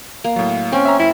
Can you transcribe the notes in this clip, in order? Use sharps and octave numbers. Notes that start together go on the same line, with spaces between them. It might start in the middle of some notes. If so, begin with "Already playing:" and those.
A#3
A2 F#3
C4 C#4 G5
E5 A#5
F#2 E4